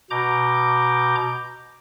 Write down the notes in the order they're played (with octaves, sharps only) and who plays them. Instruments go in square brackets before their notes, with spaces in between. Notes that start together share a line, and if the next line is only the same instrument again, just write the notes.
[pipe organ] B2 A#5 D6 G6